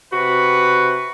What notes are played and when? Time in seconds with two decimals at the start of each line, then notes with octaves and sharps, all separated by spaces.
0.13 C3 F#4 B4